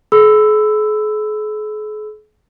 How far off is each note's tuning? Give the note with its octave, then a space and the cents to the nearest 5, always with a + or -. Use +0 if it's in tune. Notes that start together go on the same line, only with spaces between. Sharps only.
G#4 +45 B5 +30 E6 +0